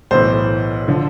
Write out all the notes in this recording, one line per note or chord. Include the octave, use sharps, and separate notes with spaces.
B1 A2 E3 C5
D3 F3